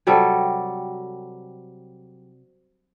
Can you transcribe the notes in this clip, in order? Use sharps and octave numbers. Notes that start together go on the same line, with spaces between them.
C3 F#3 G3 A4